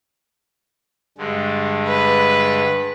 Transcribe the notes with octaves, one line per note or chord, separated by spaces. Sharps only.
G2 D3 G#3
B4